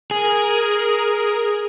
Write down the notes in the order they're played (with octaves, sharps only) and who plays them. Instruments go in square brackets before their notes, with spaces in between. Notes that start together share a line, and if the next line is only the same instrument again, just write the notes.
[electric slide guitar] G#4 [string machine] A#4